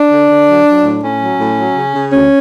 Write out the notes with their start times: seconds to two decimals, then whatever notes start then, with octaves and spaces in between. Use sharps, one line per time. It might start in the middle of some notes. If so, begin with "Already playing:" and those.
Already playing: D4
0.11 D3
0.30 D3
0.48 F#3
0.66 F#3
0.84 A2
1.02 A2 C#4
1.21 F#3
1.40 A2
1.57 F#3
1.76 C#3
1.95 C#3
2.13 D2 C#4